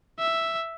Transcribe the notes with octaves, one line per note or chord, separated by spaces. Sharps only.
E5